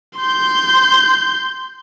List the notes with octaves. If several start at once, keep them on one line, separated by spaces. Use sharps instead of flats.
C6 G6